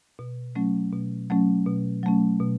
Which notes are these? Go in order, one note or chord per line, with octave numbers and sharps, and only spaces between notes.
B2
F#3 A3 C#4
B2
F#3 A3 C#4
B2
F#3 A3 C#4
B2